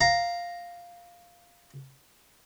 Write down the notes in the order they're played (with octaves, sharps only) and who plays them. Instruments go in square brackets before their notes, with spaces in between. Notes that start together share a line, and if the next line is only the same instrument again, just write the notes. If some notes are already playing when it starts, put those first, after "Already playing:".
[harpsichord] F5 A#5